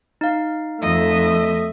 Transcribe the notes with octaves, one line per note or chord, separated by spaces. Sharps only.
D#4 F5
F2 A3 D#5 E5